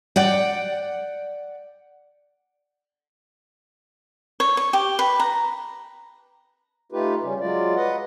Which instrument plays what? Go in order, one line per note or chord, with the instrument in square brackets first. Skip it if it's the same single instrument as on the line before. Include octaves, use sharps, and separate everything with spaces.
[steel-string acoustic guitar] D5 F#5 G5
[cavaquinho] C#5
C#5
G4
B4
A#5
[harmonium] A3 D#4 F4 G4 B4
C#3 G3 C#4
F#3 G#3 F4 D5
B4 D#5 F#5